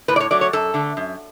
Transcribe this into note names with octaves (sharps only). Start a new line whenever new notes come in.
A2 B4
D5
C#5
F#3 A3 D5
C#5
F#2 A4
D3 A3
F#2